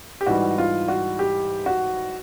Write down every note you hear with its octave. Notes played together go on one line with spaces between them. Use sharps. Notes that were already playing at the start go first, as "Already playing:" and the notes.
G4
G#2 E3 G3 F#4
F4
F#4
G4
F#4